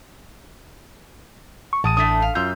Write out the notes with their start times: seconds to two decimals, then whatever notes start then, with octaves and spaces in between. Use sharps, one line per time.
1.73 C#6
1.84 A1 G#3 A5 D#6 D#7
1.97 A2 A3 D4 D#6 B6
2.22 F5
2.35 F#2 F4 E6 G6